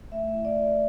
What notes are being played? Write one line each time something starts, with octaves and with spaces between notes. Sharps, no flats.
A3 E5
E4
D5
E4